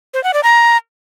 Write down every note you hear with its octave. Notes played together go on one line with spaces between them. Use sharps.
C5
F#5
D5
A#5